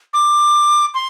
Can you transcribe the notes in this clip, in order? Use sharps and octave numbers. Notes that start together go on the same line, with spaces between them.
D6
C6